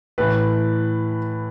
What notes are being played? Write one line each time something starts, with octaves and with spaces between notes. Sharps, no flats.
A2 E3 B4